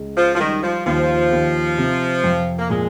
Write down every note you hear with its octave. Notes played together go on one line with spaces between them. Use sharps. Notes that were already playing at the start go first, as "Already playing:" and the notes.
Already playing: C#2
F3
F3
D#3 G3
F3
D#2 F3
D#2
C3
F2
A#3
A#2 G#3